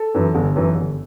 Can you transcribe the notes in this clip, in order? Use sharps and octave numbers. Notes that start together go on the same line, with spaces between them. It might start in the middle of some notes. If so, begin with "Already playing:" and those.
Already playing: A4
F#2 E3
G1
F#2 E3
G1